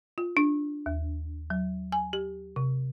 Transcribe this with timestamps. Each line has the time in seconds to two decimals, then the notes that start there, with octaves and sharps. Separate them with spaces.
0.18 F4
0.37 D4
0.86 D#2
1.50 F#3
1.92 G#5
2.13 G4
2.56 C3